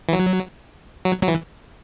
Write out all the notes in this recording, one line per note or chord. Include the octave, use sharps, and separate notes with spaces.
E3
F#3
F#3
F#3
E3